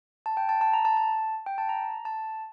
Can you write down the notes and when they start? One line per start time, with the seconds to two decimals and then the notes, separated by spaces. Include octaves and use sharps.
0.26 A5
0.37 G5
0.49 A5
0.61 A5
0.74 A#5
0.85 A5
0.97 A5
1.46 G5
1.58 A5
1.69 A#5
2.05 A5